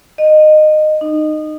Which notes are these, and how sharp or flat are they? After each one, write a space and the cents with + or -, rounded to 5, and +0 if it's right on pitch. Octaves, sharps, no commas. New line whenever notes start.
D#5 -20
D#4 -20